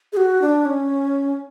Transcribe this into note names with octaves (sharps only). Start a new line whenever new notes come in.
G#4
F#4
D4
C#4